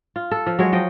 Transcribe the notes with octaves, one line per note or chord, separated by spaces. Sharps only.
F4
A4
F3
F#3 G#3 C#5
F3 D#5 G5